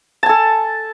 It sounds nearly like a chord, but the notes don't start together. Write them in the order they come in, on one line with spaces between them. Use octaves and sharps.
A5 G#5 A4